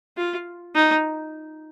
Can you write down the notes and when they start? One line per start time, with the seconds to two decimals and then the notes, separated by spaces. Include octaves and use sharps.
0.17 F4
0.75 D#4